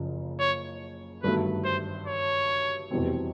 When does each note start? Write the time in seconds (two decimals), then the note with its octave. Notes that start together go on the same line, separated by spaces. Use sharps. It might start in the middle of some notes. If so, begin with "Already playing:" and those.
Already playing: F#1 C#3 F3
0.40 C#5
1.23 G1 G2 D#3 F#3 A3 B4
1.65 C5
2.07 C#5
2.91 F1 E2 B2 G3 C4